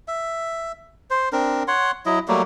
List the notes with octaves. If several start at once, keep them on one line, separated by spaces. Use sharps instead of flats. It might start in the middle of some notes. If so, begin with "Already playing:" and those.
E5
C5
C4 D4 A#4
C#5 F#5 C6
F#3 E4 D#5
F#3 G3 A3 A#3